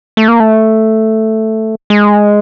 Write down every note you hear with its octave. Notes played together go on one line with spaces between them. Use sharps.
A3
A#3
A3
G#3